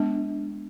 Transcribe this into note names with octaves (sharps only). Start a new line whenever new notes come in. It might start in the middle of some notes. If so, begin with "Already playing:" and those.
Already playing: G#3 B3 D4